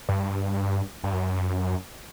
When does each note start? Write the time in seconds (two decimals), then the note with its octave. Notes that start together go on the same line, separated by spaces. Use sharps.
0.09 G2
1.04 G2
1.12 F#2